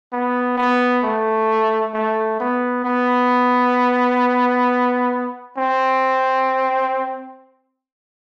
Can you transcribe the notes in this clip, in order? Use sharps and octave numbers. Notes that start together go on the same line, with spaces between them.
B3
B3
A3
A3
B3
B3
C4